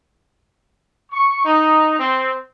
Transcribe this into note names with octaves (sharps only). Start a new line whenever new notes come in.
C#6
D#4
C4